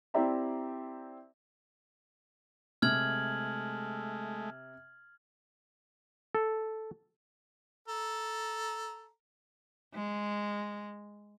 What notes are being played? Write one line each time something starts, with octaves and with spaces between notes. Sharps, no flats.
C4 E4 G4 D5 E5 A#5
C3 G#3 A3 F6 G#6 F#7
A4
A4 A#5
G#3